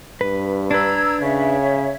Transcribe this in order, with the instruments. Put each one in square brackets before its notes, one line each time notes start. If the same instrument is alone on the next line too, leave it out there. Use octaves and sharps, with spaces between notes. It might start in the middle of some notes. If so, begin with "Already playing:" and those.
[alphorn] G2 [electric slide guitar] B4
[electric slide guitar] D4 B4 [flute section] A#5 E6 G#6
[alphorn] C#3 [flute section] C#5 E5